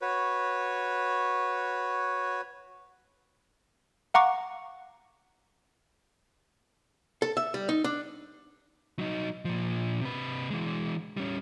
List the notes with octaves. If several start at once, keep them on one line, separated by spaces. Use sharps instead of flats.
F#4 B4 C#5
F5 F#5 A#5 C#6 D6
A4
E5
G3
D#4
D4
F#3 D#4
A#2 F3
C3 B4
E3 G#3
G3 C#4